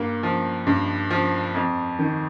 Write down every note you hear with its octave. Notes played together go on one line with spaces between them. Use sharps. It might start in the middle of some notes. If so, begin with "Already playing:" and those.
Already playing: G2 A#3
F3
G2
F3
F2
D#3